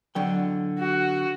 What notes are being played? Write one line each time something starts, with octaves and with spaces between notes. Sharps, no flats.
D3 F#3 G5
F#4